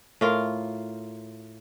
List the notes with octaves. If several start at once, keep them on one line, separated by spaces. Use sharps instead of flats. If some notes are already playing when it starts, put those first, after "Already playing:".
A2 F4 A#4 F5